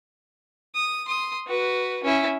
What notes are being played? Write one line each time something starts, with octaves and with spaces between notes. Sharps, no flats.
D#6
C6 D#6
F#4 B4
C#4 E4